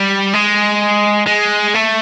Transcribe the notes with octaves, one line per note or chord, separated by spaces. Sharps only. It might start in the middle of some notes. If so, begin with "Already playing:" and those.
Already playing: G3
G#3
G#3
A3